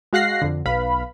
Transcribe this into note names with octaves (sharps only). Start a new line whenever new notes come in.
G#3 F#4 F5 F#6 A#6 C7
F2 D3
B1 B4 F5 B5